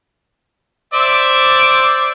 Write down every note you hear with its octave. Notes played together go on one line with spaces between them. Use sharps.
C5 D5 E5